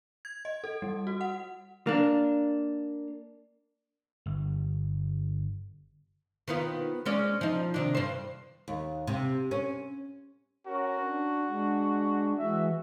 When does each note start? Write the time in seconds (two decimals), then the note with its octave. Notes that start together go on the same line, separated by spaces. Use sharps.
0.25 G#6
0.45 D#5
0.64 A4
0.82 G3
1.07 F#4
1.21 F#5
1.87 A#3 D4
4.26 G1
6.48 D#3 B3 F4
7.06 G#3 C#4 D5
7.41 F3 D#4
7.74 C3 D#3 D4
7.95 G2 C5
8.68 D#2
9.07 C3
9.51 C#4
10.67 C#4 F#4 A#4
11.02 D4
11.48 G#3 D4
12.38 E3 G#3 F#4 E5